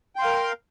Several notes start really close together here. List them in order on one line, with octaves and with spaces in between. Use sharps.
G5 C6 F5 A#4